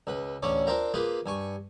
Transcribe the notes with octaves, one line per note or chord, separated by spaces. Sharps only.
C#2 B4
A1 D2 C#4 C#5 D5
C4 D4 F4 A#4 G5 A#5
A#3 F4 G4 G#4 B4
G2 G#5 C#6